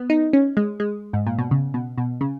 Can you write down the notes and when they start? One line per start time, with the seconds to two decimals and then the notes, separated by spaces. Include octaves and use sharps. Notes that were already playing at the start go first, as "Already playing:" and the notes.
Already playing: B3
0.10 D#4
0.33 C#4
0.57 G#3
0.80 G#3
1.13 G#2
1.27 A#2
1.38 B2
1.51 C#3
1.74 B2
1.98 B2
2.21 C#3